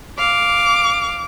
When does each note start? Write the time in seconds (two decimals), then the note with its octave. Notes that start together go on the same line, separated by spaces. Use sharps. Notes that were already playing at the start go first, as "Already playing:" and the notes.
0.18 F5 D6